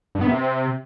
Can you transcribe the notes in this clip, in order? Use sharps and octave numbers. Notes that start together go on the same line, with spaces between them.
G2
B3
C3